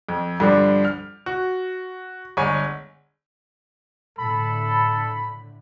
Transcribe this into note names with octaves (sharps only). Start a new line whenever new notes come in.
F2
G2 D3 F3 G3 D4
F6
F#4
G1 G#3 C#5 G#5 C#6
A2 D3 A4 B5